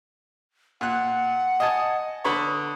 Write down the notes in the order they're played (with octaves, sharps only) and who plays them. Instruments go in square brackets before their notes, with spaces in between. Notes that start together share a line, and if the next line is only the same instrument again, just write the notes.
[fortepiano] A#2 F#6 [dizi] F#5
[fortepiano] D#5 G#5 A5
[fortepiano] D3 B4 C#5 [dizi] D#6